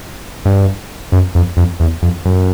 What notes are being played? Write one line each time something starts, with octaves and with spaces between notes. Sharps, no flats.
G2
F#2
F2
F2
E2
F2
F#2